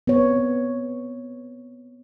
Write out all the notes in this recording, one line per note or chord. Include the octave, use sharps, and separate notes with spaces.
B3 C4 C#5